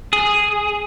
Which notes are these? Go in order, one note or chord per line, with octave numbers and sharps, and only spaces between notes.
G#4